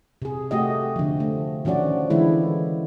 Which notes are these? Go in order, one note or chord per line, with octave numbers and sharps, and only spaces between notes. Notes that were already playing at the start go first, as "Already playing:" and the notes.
C3 G#4
A3 F#4 G4 D#5
D3 F3
A3
D#3 F3 C#4 F#4 D5
D3 E3 G#3 E4